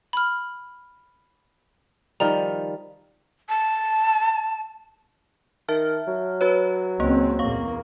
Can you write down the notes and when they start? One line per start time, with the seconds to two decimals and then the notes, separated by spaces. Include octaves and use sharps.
0.13 B5 F6
2.20 D#3 F3 G3 A#5
3.49 A5
5.68 D#3 E5 A5 F6
6.08 F#3
6.41 F#4 B4 C#5
7.00 C#2 A#3 C4 C#4
7.39 E2 A#2 A#3 F5 C#6